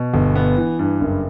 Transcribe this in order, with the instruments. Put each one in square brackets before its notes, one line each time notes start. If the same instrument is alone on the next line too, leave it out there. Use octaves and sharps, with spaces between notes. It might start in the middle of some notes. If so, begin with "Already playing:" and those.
Already playing: [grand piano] B2
G1
B3
E3
G2
F#1